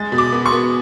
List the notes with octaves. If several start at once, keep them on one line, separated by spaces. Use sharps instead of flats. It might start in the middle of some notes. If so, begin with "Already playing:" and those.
Already playing: G#3 A6
B2
D6
B3
C#6
B3